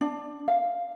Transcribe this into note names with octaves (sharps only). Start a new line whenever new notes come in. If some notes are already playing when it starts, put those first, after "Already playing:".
D4
F5